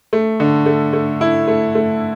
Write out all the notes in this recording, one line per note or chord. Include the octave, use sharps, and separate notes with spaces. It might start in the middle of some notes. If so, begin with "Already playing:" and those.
A3
D3
A3
A3
E4
A3
A3